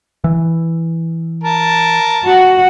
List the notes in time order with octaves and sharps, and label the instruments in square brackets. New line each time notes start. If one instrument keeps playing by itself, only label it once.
[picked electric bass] E3
[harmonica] A#4 A5
[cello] F#4 F#5